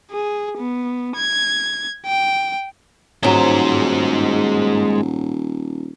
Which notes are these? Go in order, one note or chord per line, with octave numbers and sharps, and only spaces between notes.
G#4
B3
G#6
G5
D#1 G#2 F#3 G#3 C5